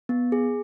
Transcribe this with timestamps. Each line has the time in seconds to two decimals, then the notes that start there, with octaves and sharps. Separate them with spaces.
0.09 B3
0.32 G#4